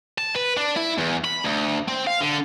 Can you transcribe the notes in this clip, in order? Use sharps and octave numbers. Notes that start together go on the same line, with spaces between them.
A5
B4
D4
E4
E2
B5
D2
C4
F5
D3